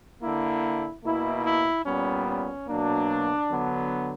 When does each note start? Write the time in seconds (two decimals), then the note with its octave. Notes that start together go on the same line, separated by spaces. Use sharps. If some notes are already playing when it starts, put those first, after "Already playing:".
0.22 D3 A#3 E4
1.04 B2 A#3 E4
1.44 E4
1.86 A#2 G3 B3 C#4
2.27 C#4
2.68 B2 F#3 A#3 D4
3.50 D3 F#3 B3